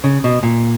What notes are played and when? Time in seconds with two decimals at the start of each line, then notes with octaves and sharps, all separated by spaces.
0.04 C#3
0.24 B2
0.43 A#2